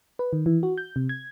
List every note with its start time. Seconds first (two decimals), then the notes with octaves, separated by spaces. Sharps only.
0.19 B4
0.33 D#3
0.46 E3
0.63 F#4
0.78 G6
0.96 C3
1.09 G#6